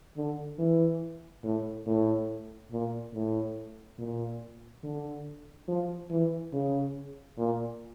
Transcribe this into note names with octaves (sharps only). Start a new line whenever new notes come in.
D3
E3
A2
A2
A#2
A2
A#2
D3
F3
E3
C#3
A#2